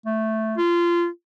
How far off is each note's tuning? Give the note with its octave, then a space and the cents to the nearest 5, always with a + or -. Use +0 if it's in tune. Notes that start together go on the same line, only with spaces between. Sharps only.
A3 +0
F4 -20